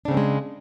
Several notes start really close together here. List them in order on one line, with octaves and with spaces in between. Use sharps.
D4 C#3 C4 A3 G#3